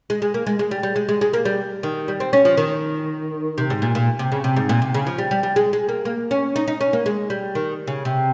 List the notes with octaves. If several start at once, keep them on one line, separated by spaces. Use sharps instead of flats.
G#3
G#3
A#3
G#3
G#3
G3
G3
G#3
G#3
G#3
A#3
G3
D#3
G3
C4
C#4
F3
D#3
C3
G#2
A#2
A#2
C3
C#3
C3
G#2
A#2
C3
C#3
F3
G3
G3
G3
G#3
G#3
A#3
A#3
C#4
D#4
D#4
C#4
A#3
G#3
G3
D#3
C#3
C3